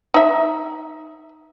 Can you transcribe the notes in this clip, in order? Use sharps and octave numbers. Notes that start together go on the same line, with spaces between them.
D#4 E5